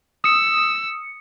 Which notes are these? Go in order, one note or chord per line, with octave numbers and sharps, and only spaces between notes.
D#6 E6 C#7